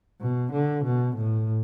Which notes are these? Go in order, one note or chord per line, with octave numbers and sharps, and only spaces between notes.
B2
D3
B2
A2